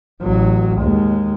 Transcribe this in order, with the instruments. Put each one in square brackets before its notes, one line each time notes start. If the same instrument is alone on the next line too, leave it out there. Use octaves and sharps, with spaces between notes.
[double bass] A1 F#3
D#2 G#3